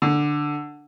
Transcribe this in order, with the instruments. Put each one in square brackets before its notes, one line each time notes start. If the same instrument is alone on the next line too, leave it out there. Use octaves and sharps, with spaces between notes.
[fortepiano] D3